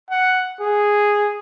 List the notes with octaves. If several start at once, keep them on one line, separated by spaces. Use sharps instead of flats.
F#5
G#4